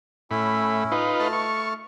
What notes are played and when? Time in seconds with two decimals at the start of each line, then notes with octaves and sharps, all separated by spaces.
0.31 A2 C#4 E4 B5
0.92 D#4 F4 B4
1.19 A3 A5 F6
1.33 C#6